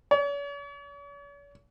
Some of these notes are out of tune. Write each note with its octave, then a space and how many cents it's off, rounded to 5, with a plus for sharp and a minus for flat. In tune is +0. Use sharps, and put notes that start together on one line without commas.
C#5 +45